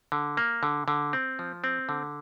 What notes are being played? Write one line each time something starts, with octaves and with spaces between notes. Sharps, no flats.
D3
A#3
D3
D3
C4
F3
C4
D3